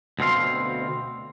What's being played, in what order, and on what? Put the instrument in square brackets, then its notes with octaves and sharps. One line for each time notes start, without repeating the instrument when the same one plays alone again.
[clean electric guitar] D2 B2 C4 F5 C6